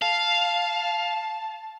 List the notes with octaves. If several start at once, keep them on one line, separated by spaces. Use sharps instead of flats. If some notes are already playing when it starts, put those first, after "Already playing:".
F5 A5